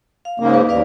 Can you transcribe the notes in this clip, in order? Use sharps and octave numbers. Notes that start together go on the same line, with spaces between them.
F5
G#2 C#3 A#3
B4
D#2 B4 D5 F5